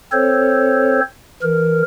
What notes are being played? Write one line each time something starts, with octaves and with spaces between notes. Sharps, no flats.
C4 A4 C5 C#5
E3 A#4